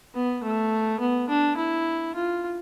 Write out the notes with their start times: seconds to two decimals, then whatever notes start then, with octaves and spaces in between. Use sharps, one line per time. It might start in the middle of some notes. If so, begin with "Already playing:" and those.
0.14 B3
0.44 A3
1.00 B3
1.29 D4
1.57 E4
2.16 F4